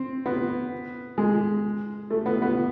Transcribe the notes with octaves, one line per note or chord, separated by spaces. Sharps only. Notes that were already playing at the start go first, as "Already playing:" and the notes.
Already playing: C4
B3
G#3
A3
B3
B3